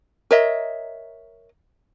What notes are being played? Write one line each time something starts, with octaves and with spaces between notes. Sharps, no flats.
A#4 C#5 D#5 E5